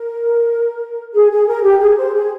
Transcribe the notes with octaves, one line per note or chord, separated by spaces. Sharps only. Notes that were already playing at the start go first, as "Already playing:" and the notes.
Already playing: A#4
G#4
G#4
A#4
G4
G#4
C5
G#4